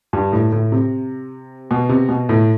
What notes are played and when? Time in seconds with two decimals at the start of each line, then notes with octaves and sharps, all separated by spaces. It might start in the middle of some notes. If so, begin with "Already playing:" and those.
0.13 G2
0.32 A2
0.52 A2
0.72 C3
1.71 B2
1.89 C3
2.09 B2
2.29 A2